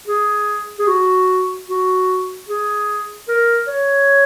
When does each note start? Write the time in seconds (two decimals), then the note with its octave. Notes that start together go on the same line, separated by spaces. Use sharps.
0.08 G#4
0.79 G#4
0.88 F#4
1.68 F#4
2.48 G#4
3.28 A#4
3.67 C#5